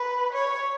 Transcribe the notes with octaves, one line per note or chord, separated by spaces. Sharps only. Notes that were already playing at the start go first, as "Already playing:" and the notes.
Already playing: B4
C#5